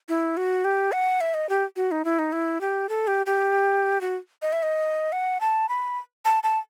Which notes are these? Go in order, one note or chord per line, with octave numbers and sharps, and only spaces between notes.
E4
F#4
G4
F#5
E5
D#5
G4
F#4
D#4
E4
D#4
E4
G4
A4
G4
G4
F#4
D#5
E5
D#5
F#5
A5
B5
A5
A5